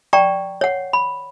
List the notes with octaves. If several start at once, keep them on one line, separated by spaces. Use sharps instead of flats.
D5 G5 A#5 C#6
C#5 F#5
B5